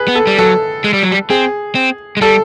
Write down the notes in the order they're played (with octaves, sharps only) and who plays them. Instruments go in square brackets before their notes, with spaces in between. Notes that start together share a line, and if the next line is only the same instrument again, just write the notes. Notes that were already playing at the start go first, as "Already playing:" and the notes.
Already playing: [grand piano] G#4 B4
[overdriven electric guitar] B3
[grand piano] A4
[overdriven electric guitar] G3
[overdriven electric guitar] F#3 [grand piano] A4
[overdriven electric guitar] G#3
G3
F#3
G3
[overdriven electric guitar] C4 [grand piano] G#4
[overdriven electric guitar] C4
G#3
[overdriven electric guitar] G3 [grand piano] A4